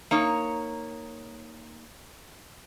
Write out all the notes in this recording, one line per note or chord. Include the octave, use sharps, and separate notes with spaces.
A#3 D#4 C#5